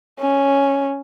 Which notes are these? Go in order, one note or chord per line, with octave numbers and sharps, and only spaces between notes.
C#4